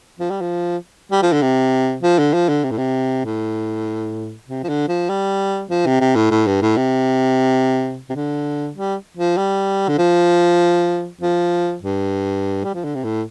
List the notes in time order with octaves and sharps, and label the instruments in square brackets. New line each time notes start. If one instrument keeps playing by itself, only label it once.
[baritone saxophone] F3
G3
F3
G3
F3
D3
C3
F3
D3
F3
D3
C3
A2
C3
A2
C3
F3
D3
F3
G3
F3
C3
C3
A2
A2
G2
A2
C3
C3
D3
G3
F3
G3
D3
F3
F3
G2
G3
F3
D3
C3
A2